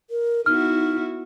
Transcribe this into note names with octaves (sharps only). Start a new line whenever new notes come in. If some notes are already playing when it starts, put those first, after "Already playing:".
A#4
B3 D#4 E4 F#4 F6